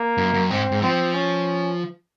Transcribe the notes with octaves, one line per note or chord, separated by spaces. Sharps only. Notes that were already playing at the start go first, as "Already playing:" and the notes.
Already playing: A#3
F#2
F#2
G#2 C4
G#2
F3 C4
C#4